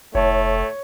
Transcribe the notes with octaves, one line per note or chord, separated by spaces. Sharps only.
F1 A2 A3 C#5